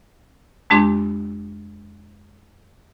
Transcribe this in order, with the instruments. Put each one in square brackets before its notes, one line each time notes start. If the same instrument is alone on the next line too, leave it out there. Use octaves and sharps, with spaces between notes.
[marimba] F2 G#3 D4 G4 C6